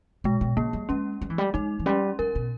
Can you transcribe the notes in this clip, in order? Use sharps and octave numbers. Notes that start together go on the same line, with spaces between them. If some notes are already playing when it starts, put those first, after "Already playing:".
B2 G#3
B2
C#3 A#3
G3
G#3 C#4
G3
E3
G3
G#3 D#4
E3
G3 C#4
G3 A#4
B2